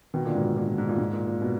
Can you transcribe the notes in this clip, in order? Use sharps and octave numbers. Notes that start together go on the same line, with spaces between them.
B2 D#3
A#2 D3
G#2 B2
A#2
A#2
A#2
G#2
A#2
G#2
A#2
A#2
B2